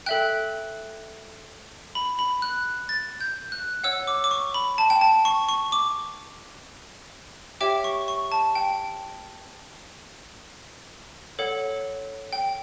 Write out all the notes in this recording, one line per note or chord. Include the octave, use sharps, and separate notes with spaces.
A4 E5 G5 F#6
B5
B5
F#6
A6
G6
F#6
C#5 F#5 E6
D6
D6
C#6
B5
A5
G5
A5
C#6
C#6
D6
G4 C#5 E5 G5 D6
C#6
C#6
A5
G5
A4 C#5 F#5
G5